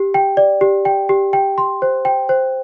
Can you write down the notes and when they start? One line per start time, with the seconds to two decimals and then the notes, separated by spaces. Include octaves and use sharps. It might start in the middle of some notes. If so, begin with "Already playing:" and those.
Already playing: G4
0.14 G5
0.37 D5
0.61 G4
0.85 G5
1.09 G4
1.33 G5
1.58 C6
1.82 C5
2.05 G5
2.29 C5